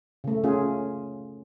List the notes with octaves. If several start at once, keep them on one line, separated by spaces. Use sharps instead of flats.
C#3 A3
C#4 F4 G#4